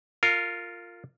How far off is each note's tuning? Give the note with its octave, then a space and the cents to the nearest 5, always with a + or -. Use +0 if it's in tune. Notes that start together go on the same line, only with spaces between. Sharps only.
F4 +0 A#4 -25